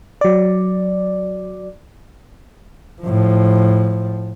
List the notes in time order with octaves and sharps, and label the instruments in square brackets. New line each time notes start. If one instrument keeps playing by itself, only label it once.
[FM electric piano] F#3 D5
[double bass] A2 F3